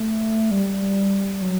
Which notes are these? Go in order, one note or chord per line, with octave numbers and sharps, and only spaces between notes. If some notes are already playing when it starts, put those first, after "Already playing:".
Already playing: A3
G3
F#3